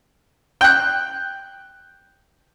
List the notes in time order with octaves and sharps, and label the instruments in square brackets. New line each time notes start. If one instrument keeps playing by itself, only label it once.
[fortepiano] G5 F#6